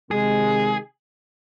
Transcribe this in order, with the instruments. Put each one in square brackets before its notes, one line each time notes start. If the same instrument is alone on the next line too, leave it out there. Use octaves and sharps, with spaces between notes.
[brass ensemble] C3 D#3 G#3 [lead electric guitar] G#4